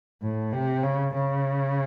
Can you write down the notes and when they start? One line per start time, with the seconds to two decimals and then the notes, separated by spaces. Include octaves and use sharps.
0.22 A2
0.52 C3
0.83 C#3
1.14 C#3